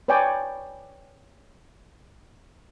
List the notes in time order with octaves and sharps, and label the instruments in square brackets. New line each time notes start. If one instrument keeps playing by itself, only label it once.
[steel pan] B4 C#5 D5 G5 G#5